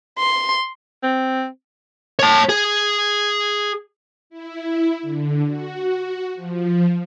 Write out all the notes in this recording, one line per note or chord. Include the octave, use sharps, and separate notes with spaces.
C6
C4
C#5 A5
G#4
E4
D3
F#4
F3